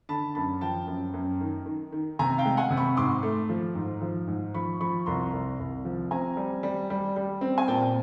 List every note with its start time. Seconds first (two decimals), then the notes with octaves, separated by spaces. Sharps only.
0.09 D3 A5 B5
0.35 F#2 A5 B5
0.61 F3 G5 A5
0.87 F#2
1.14 F#2
1.41 D#3
1.66 D#3
1.92 D#3
2.19 C3 G#5 A#5
2.38 F5 G5
2.45 G#3
2.57 F#5 G#5
2.70 C3
2.77 B5 C#6
2.97 G#2 C6 D6
3.23 A3
3.49 F3
3.75 G#2
4.02 F3
4.27 G#2
4.54 F3 B5 C#6
4.81 F3 B5 C#6
5.06 C2 A#5 C6
5.33 C2
5.59 C2
5.85 F3
6.11 C4 G#5 A#5
6.37 G3
6.63 G3
6.90 G3
7.16 G3
7.41 C4
7.58 G#5
7.68 A#2 G5 A5